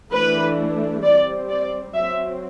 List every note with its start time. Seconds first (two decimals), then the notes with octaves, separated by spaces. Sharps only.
0.13 E3 A3 D4 B4
1.03 G3 C4 D5
1.49 D5
1.94 F#3 C4 E5